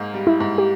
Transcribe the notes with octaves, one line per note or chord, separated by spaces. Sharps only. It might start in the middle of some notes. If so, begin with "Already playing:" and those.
Already playing: G#2 A#3
G3
E4
G#2
G4